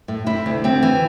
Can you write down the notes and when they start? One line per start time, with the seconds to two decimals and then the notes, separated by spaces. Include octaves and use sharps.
0.08 A2
0.26 C3 E4
0.46 D2
0.64 D2 C4
0.83 E3